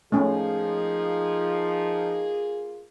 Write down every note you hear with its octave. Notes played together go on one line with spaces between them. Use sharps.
F3 A3 A#3 C#4 D#4 F4 G#4